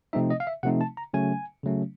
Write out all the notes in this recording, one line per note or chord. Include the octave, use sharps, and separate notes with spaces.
C3 F3 A3 C4 D#4 E5
D#5
F5
E5
C3 F3 A3 C4 D#4 F#5
A5
A#5
C#3 F#3 A3 C#4 G#5
C#3 F#3 A3 C#4